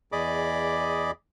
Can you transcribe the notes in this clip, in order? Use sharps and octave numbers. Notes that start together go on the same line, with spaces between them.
E2 G#4 D5 D#5 B5 D6